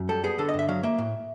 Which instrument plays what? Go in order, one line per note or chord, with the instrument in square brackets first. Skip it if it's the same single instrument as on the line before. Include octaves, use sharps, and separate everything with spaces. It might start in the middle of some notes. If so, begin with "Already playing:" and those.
Already playing: [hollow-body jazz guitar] F#2
G3 A4
B3 G#4
D3 A4
D#5
G2
E5
F#3 F5
A#3 E5
A2